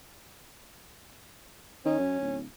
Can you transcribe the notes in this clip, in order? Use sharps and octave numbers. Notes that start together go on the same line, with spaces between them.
D#3 C#4
F#2
D1